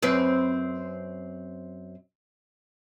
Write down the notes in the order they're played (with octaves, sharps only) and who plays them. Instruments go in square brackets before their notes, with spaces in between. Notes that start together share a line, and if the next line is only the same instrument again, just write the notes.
[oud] F#2 C4 B4